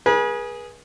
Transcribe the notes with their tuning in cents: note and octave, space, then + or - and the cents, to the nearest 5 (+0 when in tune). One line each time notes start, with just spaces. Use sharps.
G#4 +0 B4 -40